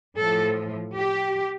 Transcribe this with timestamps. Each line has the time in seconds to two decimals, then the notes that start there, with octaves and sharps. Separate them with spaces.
0.20 A2 F3 A4
0.96 G4